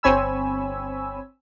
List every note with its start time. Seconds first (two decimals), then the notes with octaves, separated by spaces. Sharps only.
0.03 G1 C4 C#5 G#5 B5 E6